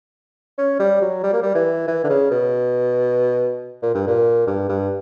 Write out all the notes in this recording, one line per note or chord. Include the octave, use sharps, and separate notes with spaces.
C#4
G3
F#3
G3
A#3
G3
E3
E3
D3
C#3
B2
A#2
G2
A#2
G2
G2